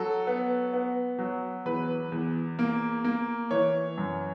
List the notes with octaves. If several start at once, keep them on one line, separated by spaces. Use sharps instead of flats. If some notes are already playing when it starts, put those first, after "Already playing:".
Already playing: F#3 A4
B3
B3
F#3
E2 B4
E2
A#3
A#3
E3 C#5
F#2